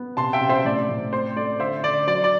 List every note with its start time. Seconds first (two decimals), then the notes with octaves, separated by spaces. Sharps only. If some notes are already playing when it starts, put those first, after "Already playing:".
Already playing: B3
0.17 C3 A5 C6
0.33 E5 G5
0.41 C3
0.49 C5 E5
0.65 A2 D5
0.89 A2
1.13 C4 C5
1.36 A3 D5
1.60 D3 C5 E5
1.84 D3 D5
2.07 F#3 D5
2.24 D5